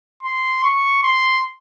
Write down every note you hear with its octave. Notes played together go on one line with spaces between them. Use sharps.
C6
C#6
C6